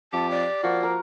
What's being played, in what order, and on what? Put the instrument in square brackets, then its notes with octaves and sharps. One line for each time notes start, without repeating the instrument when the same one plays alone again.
[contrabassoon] F2 [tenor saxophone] G4 [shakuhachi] A5
[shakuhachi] D5
[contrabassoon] F3 [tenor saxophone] A#3 [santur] F#4
[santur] A#4